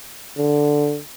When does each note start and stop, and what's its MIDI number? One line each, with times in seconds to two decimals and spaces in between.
0.38 0.99 50